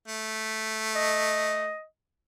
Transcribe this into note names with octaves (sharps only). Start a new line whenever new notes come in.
A3
D#5